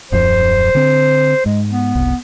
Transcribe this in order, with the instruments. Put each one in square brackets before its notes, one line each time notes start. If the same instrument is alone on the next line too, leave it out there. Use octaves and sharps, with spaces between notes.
[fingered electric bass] D#1 F#2 F3 [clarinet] C5
[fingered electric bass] D3 C4
[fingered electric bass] G#2 [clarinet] G#3
[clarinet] B3
[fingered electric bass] F#1 C2